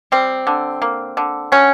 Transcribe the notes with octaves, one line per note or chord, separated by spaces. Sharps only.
G3 C4
D3
A#3
D3
F#3 C#4